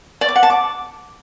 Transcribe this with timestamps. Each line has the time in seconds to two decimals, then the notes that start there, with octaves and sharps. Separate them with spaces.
0.21 D5
0.28 D6
0.36 F#5
0.43 A5
0.50 D6